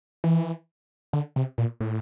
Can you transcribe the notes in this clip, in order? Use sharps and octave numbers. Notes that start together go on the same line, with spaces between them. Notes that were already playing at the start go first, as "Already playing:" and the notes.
E3
D3
C3
A#2
A2